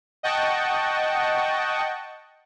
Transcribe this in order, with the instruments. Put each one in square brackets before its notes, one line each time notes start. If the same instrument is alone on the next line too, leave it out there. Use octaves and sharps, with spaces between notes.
[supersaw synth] D#5 F#5 G5 A5 C#6